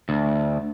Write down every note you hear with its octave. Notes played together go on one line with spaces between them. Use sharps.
D2